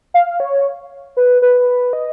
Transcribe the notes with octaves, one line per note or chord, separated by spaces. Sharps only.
F5
C#5
B4
B4
D#5